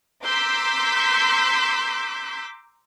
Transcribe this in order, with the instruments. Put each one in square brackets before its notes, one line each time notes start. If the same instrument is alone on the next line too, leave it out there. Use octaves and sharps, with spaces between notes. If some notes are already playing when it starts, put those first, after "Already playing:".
[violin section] A#5 C6 D6 E6 G6 B6